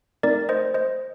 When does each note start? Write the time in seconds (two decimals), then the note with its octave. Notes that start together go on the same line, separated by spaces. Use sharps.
0.23 A3 C4 D#4 A#4 D5
0.49 C5 D#5
0.74 C5 D#5